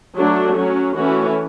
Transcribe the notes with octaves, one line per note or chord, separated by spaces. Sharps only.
F#3 A3 D4
F#3 C#4
E3 A3 C#4 F#4